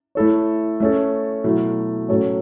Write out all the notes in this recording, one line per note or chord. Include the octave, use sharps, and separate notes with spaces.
A3 E4 A4 C#5
A3 C#4 A4
B2 F#3 A3 E4
A2 F#3 C#4 A4 C#5